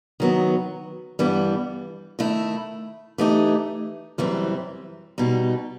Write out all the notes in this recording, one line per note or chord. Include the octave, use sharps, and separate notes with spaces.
D#3 F#3 B3
G2 E3 G3 B3
D#3 A3 E4
E3 A3 D#4 G4
F#2 E3 G3 C4
B2 G3 D#4